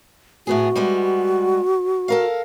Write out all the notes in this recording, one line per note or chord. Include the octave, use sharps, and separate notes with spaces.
A2 B3 F#4 G#4
G3 G#3 B3
A4 A#4 F5